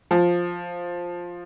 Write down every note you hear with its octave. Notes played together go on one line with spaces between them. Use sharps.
F3